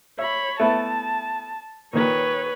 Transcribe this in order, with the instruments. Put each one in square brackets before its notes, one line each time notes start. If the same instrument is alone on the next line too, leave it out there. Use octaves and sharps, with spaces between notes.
[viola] C#5 B5 [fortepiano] E5
[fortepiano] A3 B3 E4 [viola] A5
[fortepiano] A#2 D#3 [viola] B4 C#5